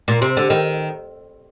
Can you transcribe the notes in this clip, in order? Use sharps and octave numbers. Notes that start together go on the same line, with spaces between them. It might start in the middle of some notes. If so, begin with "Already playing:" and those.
A#2
C3
D3
D#3